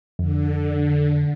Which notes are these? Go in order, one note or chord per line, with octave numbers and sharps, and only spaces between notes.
F2 D3